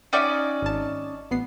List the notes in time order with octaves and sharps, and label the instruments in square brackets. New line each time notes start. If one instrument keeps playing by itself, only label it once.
[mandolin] C#4 D#4 D5 [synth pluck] E5 F#5 G5
[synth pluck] G#1 A5
A1 B3 C7